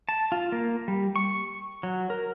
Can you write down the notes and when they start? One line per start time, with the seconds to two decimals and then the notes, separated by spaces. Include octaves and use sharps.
0.09 A5
0.32 F4
0.52 A#3
0.88 G3
1.16 C#6
1.83 F#3
2.10 A#4